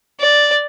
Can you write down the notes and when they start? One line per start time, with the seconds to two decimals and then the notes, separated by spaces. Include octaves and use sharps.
0.20 D5